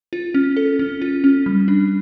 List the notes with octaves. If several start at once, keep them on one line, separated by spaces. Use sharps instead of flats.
F4
C#4
A4
C#4
F4
C#4
G3
D4